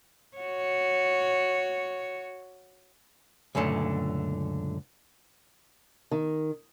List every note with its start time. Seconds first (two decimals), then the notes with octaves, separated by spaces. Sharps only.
0.37 F#4 C#5
3.55 C#2 F#2 A#2 D3 A3
6.11 D#3